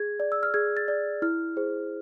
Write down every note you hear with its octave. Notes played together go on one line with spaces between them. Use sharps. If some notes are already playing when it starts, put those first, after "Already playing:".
Already playing: G#4 G#6
D5
E6
F6
G#4 G#6
A6
D5
E4 F6
G#4 C5